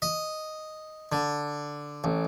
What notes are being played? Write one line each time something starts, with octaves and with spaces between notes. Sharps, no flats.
D#5
D3
A1